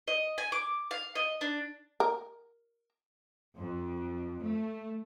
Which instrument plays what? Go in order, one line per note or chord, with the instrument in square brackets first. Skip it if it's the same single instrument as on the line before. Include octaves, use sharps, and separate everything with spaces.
[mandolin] D#5
G#5
D6
F5
D#5
D4
[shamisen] A#4
[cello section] F2
A3